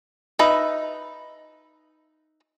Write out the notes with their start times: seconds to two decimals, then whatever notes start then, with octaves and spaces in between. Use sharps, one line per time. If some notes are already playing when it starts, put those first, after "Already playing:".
0.39 D#4 B4 E5